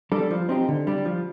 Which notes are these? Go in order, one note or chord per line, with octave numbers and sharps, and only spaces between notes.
G3 D4 A4
F3
C4 D#4 G4
D3
G3 D4
F3